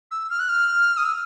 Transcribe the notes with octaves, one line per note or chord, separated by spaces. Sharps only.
E6
F6
F#6
F6
D#6
E6